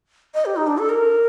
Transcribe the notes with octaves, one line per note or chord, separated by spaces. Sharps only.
D#5
G4
D#4
D4
A4
A#4